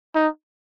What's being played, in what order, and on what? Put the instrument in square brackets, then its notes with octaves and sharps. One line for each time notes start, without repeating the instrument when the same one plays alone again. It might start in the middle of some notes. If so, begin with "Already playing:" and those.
[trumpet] D#4